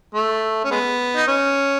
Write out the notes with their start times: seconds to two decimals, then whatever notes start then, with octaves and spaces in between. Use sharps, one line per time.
0.14 A3
0.64 C#4
0.71 G#3 B3
1.16 D#4
1.28 C#4